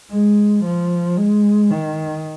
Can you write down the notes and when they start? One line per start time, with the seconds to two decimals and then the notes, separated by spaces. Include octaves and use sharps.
0.11 G#3
0.65 F3
1.18 G#3
1.71 D#3